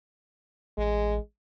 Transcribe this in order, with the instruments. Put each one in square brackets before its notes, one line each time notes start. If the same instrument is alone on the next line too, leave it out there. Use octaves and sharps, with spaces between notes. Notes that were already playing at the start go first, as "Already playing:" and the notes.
[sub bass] A1 [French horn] G#3